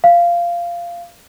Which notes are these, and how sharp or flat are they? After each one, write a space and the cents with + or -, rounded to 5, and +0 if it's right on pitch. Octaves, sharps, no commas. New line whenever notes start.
F5 -15